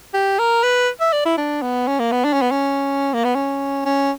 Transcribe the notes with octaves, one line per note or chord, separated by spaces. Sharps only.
G4
A#4
B4
E5
D5
E4
D4
B3
C#4
A#3
B3
D4
C#4
B3
C#4
A#3
B3
C#4
C#4